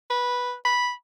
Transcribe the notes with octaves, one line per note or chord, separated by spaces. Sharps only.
B4
B5